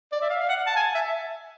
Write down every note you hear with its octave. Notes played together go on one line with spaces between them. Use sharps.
D5
E5
F5
F5
F#5
A5
G#5
E5